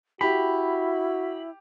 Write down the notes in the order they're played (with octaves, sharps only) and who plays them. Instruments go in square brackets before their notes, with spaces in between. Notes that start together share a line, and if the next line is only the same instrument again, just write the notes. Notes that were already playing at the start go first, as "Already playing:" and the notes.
[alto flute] E4 [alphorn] F#4 [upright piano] G4 [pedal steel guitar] B5